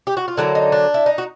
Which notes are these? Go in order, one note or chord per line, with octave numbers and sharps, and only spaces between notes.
G4
F#4
F4
D3 F#3 A#3 E4
D#4
D4
E4
D#4
F#4